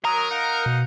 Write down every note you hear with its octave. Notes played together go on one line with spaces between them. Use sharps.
F#3 A#4 D#6
D#4 F5 F#5
B2